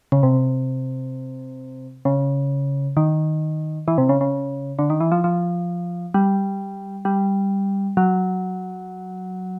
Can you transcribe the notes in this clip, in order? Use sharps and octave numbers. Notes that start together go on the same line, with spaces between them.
C#3
C3
C#3
D#3
E3
C3
C#3
C#3
D3
D#3
E3
F3
F3
G3
G3
F#3